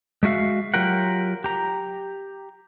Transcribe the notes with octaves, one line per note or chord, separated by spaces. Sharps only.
G#3 A3 F#4 E5 F5
F#3 F4 G4 A#4 F#5
G4 A#5